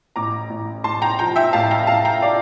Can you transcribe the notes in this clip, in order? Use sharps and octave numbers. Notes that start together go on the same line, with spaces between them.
A1 A#5 D6
A1
A1 A5 C6
G5 A#5
F3 G5 A#5
E5 G5
A1 F5 A5
G5 A#5
A1 F5 A5
G5 A#5
D5 F5